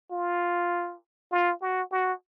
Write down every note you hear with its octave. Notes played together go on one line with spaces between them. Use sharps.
F4
F4
F#4
F#4